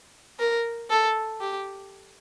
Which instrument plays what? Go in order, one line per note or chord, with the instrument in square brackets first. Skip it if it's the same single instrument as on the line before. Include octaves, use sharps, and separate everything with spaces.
[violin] A#4
A4
G4